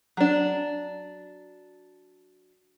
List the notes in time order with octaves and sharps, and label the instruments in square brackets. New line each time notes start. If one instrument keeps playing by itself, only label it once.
[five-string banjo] F#3 D4